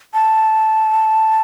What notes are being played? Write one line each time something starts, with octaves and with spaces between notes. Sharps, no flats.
A5